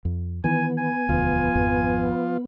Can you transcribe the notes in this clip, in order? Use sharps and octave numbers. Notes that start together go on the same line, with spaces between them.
F2
D#3 E3 B3 G#5
G#5
E1 D2 F3 F4
G#1 F2